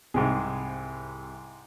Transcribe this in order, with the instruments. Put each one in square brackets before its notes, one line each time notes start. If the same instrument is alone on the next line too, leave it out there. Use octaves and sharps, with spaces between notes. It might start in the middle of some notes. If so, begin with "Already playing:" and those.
[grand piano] C2 [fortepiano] G#2 C3 G#4